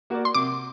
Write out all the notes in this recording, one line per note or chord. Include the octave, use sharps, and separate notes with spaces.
A#3 F#4 A#4 D5
C6
C3 D6